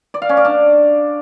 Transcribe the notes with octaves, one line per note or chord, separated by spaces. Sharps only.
D5
F5
C#4
D5
D4